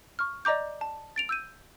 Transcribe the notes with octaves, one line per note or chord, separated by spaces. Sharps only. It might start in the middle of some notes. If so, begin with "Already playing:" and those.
C#6 F6
D5 D#5 A#5 D6 G6
A5
A6 D7 F7
E6 G6 D#7